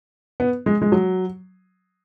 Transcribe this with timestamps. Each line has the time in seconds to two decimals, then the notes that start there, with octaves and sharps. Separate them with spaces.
0.40 B3
0.66 G#3
0.82 G#3
0.92 F#3